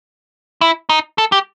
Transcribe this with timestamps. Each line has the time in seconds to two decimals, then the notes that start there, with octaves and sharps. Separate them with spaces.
0.61 E4
0.89 D#4
1.18 A4
1.32 G4